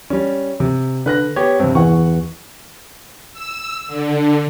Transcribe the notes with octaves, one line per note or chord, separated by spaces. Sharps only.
G3 C#4
C3
D3 B4 F#6 A#6
B3 G4 C#5
G2 C3 C4
E2 E3 F#5 C#6
E6
D3